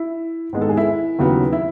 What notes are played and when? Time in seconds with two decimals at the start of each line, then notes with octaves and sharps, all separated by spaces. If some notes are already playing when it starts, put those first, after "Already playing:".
Already playing: E4
0.53 G#2 D#3 G#3 B3
0.62 A4
0.69 G#4
0.77 E4
1.19 D#2 C#3 F#3 B3
1.52 E4